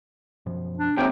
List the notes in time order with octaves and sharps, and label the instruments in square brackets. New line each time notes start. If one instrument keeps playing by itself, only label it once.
[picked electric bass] F#2 B2 F3
[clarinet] D4
[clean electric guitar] D#2 C3 [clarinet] G5